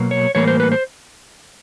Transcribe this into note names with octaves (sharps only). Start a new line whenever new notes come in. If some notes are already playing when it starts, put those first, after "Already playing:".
Already playing: B2 F#3 A#3
C#5
A2 E3 G3 A#3 C#5
C5
B4
C5